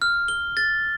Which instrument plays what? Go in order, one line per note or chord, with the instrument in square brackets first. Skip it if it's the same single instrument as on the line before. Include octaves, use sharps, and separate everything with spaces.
[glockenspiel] F6
G7
A6